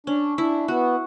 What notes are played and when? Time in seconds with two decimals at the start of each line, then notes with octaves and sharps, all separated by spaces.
0.06 C#4 D4
0.38 D4 E4
0.68 B3 F#4